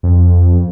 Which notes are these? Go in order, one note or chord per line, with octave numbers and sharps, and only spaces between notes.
F2